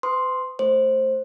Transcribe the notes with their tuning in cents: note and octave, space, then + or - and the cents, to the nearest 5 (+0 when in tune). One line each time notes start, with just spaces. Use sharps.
B4 +45 C6 +0 D#6 +0
A3 +0 C5 +15